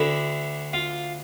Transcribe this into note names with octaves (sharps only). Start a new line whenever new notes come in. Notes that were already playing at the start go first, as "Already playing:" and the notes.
Already playing: D2 D3 E4
F4